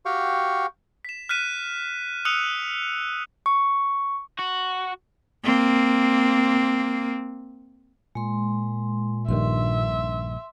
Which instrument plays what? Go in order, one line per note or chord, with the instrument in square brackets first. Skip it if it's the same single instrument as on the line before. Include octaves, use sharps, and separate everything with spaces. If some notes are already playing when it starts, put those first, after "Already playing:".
[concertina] F#4 G4 F5 G5 C#6
[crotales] B6 E7
F6 F#6 B6 D#7 E7
D#6 E6 F#6 C#7 D#7 F7
[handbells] C#6
[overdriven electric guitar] F#4
[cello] A#3 C4
[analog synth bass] A#2 [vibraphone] G#3 C6
[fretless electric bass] A#1 G2 D#3 [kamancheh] E5 [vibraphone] C6